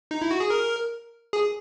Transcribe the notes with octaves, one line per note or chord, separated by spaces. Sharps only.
D#4
E4
F#4
G#4
A#4
G#4